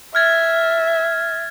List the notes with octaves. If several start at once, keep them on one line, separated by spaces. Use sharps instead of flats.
E5 F6 G#6 A6